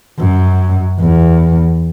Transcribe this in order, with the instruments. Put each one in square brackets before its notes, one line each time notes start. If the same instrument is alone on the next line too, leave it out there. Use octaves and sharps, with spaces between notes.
[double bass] F#2
E2